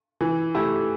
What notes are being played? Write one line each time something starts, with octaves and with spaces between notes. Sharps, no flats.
E3
A3 E4 G4